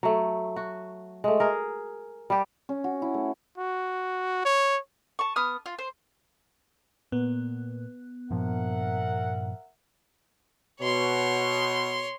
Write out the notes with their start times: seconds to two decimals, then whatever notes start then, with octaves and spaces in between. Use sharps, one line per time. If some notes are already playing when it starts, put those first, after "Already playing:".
0.03 F#3 A3
0.56 F#4
1.24 G#3 A3
1.40 G#4 A#4
2.30 G3 G4
2.69 C#4
2.84 F#4
3.02 E4
3.14 A3
3.58 F#4
4.45 C#5
5.19 A5 C#6
5.36 B3 D#6 F6
5.66 F4
5.79 C5
7.12 A#2 B3
8.30 G2 A#2 F3 A#4 E5 F#5
10.81 B2 C#5 C6